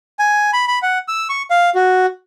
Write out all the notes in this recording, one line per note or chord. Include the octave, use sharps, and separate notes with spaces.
G#5
B5
B5
F#5
E6
C#6
F5
F#4